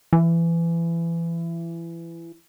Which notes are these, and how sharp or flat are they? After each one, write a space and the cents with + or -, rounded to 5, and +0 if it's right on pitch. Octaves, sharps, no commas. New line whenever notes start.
E3 +25